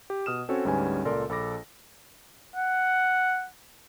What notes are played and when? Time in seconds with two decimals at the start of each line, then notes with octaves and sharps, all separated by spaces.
0.10 G4
0.26 B2 D#6 F6 E7
0.49 C4 C#4 F#4 A4 C#5
0.65 D2 G#2 G3 C#4 B4 G#5
1.05 C#2 A#2 A4 A#4 D5 C6
1.29 A#1 A4 B5 D6 A#6
2.56 F#5